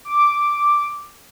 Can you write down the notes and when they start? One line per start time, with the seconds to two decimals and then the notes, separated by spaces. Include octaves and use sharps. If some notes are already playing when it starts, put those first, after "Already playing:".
0.05 D6